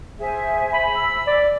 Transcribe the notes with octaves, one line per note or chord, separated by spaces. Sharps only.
G#4 C5 E5 G#5
B5
E6
D5